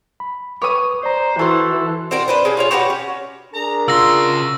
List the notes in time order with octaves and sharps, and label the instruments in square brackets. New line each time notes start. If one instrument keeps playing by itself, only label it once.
[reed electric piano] B5
[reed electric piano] B4 D6 [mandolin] C#5 D#6
[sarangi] C5 [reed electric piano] D5 A#5
[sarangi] E3 [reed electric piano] F#4 C#6 [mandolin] A4 C5
[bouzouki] C4 F#4 A#4 D5
D4 B4 C5
G#3 C#4
F4 F#4 C#5
F#4 G4 B4 F#5
C#4
[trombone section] D4 G#4 A#4 [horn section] A#5
[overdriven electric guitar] C#3 C6 [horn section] F4 F#4 [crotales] E6 A#6